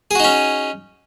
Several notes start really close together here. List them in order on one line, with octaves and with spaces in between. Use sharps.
G#4 F#4 D#4 C#4